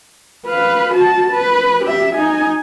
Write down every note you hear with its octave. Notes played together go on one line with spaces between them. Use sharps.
B4 F5
F#4 A5
B4
G4 E5
D#4 G#5